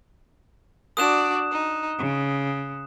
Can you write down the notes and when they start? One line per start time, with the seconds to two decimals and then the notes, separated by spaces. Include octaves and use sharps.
0.97 D4 F#4 D5 D#6 F#6 E7
1.52 D#4
1.98 C#3